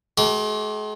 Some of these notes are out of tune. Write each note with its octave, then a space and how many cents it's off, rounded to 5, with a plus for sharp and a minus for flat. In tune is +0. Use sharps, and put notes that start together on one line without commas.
G#3 +40 G4 -40 A#4 +20